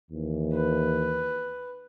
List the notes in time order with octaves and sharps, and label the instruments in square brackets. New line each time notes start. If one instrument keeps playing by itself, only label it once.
[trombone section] D#2 E3
[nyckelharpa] B4